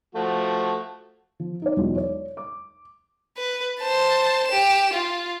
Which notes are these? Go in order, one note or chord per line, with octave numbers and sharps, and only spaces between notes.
F3 A3 F#4
F3
D#4 D5
B1 E2 D#3 F#3 G#3 F4
C#5 D5
D6
B4
C5 A5
G4 E7
F4